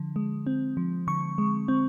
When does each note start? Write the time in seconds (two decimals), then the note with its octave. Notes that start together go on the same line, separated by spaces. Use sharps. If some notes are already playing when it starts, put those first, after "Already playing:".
Already playing: D3 F3
0.16 G#3
0.47 C4
0.77 F3
1.07 D3 C#6
1.38 G#3
1.68 C4